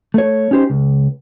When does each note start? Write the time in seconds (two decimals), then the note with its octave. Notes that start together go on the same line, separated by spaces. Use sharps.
0.14 A3 C#5
0.51 C#4 D#4 G4 C5
0.70 C#2